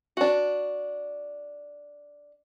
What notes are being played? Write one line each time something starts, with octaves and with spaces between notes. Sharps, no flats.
D4 F#4